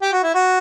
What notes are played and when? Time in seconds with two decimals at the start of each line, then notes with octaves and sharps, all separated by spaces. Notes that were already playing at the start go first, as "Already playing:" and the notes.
0.02 G4
0.13 F#4
0.23 E4
0.34 F#4